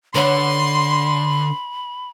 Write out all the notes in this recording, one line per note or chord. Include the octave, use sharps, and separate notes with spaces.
D3 B4 C#5 F#5 B5 C6